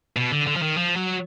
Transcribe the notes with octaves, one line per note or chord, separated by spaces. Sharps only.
B2
D3
D3
F3
D#3
F3
F#3